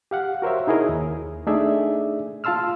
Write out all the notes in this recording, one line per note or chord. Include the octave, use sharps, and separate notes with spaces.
G4 F5 F#5
F#4 A#4 C5 C#5 E5
D#4 E4 G#4 A#4 C#5 D#5
D#2
A3 D4 D#4 G#4 D5 E5
F4 F5 A5 C6 E6 F6